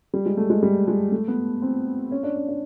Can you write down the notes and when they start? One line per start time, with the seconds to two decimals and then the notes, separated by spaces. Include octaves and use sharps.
0.14 G3
0.26 G#3
0.37 A3
0.50 G#3
0.63 G3
0.88 G#3
1.12 A3
1.28 B3
1.62 C4
2.11 C#4
2.23 D4
2.36 C#4
2.48 D4